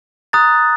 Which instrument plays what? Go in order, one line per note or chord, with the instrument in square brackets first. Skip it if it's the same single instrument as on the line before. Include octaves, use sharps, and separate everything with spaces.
[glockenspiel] A#5 D#6 F#6 A6